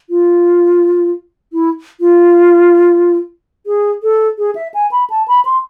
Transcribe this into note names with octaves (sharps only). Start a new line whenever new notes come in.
F4
E4
F4
G#4
A4
G#4
E5
G#5
B5
A5
B5
C6